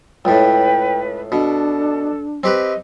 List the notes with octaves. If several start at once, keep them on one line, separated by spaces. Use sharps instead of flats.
C#2 A2 B4 G5
B2 D4 A4
C4 G4 B4 D#5